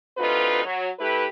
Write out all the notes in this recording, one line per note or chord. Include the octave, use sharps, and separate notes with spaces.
D2 C3 D#4 F4 B4
F#3
A3 E4 G4 B4